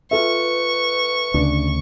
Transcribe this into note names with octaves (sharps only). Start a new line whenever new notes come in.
F4 A4 B4 E5 C#6
D2 C#3 D4